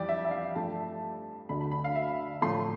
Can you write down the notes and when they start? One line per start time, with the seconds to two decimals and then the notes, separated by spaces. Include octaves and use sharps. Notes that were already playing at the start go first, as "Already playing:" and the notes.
Already playing: F2 E3 G3 G4 D5
0.09 E5
0.25 E5
0.31 F5
0.55 G2 F3 A3 A5
1.49 D2 D3 A3 B5
1.61 B5
1.71 B5
1.84 F5
1.96 E5
2.42 A2 F3 A3 C6